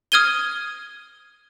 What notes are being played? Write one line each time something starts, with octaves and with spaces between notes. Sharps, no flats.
D#6 F6 G#6 D#7 G7